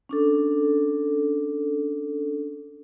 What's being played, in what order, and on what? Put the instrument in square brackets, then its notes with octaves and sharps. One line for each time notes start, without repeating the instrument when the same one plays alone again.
[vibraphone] C#4 D4 A4